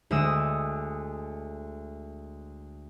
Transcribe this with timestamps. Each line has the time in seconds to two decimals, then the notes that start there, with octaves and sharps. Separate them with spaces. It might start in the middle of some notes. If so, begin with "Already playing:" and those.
0.11 D2 G#3 D#6 E6